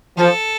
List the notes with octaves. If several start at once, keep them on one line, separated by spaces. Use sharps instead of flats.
F3 A4